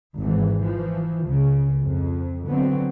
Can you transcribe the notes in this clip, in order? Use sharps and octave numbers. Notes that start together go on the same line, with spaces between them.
G#1 G#2 E3
E3 F3
C#2 C#3
F2
D3 F#3 B3 C4